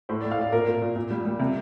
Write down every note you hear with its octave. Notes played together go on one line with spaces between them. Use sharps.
A2 C5
D5
A2
F5
A2 D5
A#2 A#4
A#2
A#2
A#2
G3
G3
C3